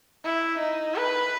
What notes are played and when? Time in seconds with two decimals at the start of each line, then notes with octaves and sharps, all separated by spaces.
0.25 E4
0.60 D#4
0.96 B4